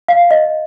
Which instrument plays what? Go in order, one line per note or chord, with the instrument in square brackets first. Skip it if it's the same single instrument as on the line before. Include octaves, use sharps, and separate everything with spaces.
[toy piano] F5
D#5